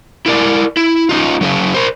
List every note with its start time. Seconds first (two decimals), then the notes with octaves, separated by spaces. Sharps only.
0.26 E4 A#4 D5
0.77 E4
1.09 C#4 D#4 F4
1.41 F#3 C#4 G#4
1.74 A#4 C5